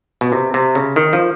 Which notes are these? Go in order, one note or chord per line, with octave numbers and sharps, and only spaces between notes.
B2
C3
C3
C#3
D#3
F3